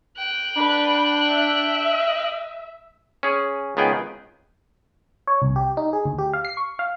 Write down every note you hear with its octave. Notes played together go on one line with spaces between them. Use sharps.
G5 F#6
D4 B4
E5
C#4 G#4
C#2 D#3 B3 G#4 G5
C#5
C2
G4
D#4
G#4
D2
G4
F5
C7
C#6
F5